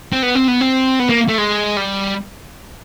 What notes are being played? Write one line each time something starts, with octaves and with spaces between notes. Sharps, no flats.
C4
B3
C4
B3
C4
B3
A#3
A3
G#3
G3